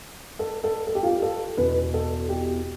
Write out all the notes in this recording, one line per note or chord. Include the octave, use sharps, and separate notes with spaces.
A4
A4
A4
G4
F4
G4
A4
E2 B2 B4
A4
G4